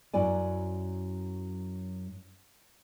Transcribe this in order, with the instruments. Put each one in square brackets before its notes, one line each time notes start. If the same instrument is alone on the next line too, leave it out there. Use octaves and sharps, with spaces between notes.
[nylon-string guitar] F#2 F#3 E4 D5 G#5